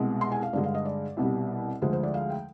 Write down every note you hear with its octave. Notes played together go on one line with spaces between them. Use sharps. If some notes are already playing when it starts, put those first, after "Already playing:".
Already playing: C2 B2 G#3
C6
G#5
F5
G2 D3 G#3 D5
F5
D#5
D5
C2 B2 G3
D2 D3 F3 G#3 C5
C5
D5
F5
G5